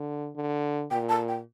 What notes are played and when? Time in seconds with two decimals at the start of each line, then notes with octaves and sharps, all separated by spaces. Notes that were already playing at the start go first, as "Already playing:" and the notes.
Already playing: D3
0.36 D3
0.91 A#2 G5
1.09 A5
1.28 G5